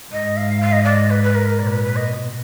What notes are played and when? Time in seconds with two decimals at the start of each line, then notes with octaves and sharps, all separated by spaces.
0.12 G#2 D#5
0.37 F5
0.61 F5
0.72 D#5
0.83 D5
0.95 D#5
1.09 B4
1.23 B4
1.34 A#4
1.58 A#2 D5
1.67 A#4
1.71 B4
1.83 B4
1.96 D#5
2.08 B2